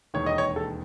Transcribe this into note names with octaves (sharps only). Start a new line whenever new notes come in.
E1 D#2 D#3 C#5
D#5
C#5
A4